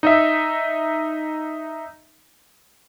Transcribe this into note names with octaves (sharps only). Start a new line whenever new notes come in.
D#4 D#5 E5